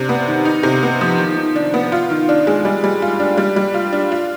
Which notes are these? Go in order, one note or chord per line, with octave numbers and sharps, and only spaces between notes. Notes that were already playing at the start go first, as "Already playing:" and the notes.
Already playing: C3 D4
B3
D#3
D#4
C3
B3
F3
D#3
D#3
D4
B3
F4
D#3
D4
G#3
G3
G3
F4
D4
G3
G3
F4
D4
F4